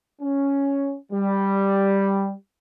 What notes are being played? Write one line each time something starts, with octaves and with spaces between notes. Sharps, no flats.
C#4
G3